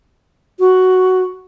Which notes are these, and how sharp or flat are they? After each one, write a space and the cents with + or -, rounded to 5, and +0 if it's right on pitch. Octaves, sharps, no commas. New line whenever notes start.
F#4 +5